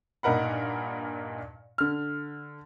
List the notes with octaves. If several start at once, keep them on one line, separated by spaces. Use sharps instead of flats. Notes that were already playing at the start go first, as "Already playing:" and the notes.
G2 A#2 D#4 A#4 F#5 B5
D3 F6